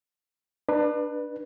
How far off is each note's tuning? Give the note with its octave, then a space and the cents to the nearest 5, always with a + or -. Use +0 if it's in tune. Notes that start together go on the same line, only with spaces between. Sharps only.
D4 +30 B4 -15